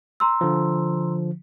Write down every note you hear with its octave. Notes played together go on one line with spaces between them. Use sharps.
A#5 C6 E6
D3 F3